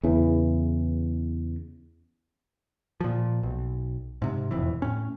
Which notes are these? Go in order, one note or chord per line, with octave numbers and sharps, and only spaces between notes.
E2 C#3 E3
A#2 F3
B1
G#2 C3
E1 F2 E3
A2 C#4